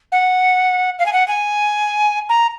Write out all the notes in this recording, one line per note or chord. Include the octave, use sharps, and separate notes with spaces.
F#5
F5
G#5
F#5
G#5
A#5